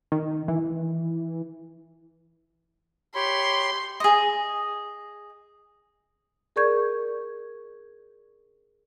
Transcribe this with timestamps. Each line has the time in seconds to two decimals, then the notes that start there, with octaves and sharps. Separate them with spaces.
0.12 D#3
0.48 E3
3.15 G4 C#5 B5 C6
4.00 G#4 D#5
6.56 G#4 A#4 D5 C#6 G6 G#6